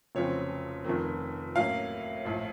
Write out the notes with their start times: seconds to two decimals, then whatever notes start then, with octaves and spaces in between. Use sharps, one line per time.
0.15 F1 F2 C#3 F#3 C4 C#5
0.84 F1 F2 D#3
1.55 A2 F#3 A#3 C#4 F5
2.25 A#1 A2 F3